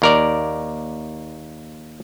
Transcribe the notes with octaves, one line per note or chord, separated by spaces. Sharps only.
D#2 A#4 D5